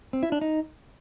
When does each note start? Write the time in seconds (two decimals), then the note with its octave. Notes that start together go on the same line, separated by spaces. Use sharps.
0.13 C4
0.23 E4
0.32 D4
0.41 D#4